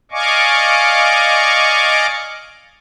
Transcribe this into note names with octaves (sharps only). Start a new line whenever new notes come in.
D5 D#5 F5 G#5 C#6 D6